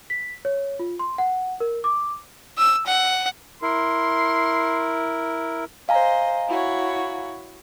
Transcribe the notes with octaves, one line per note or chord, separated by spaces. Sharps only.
B6
C#5
F4
C6
F#5
A#4
D6
E6
F#5
E4 A#4 C6
C5 D#5 F5 G#5 A#5
E4 F#4 C#5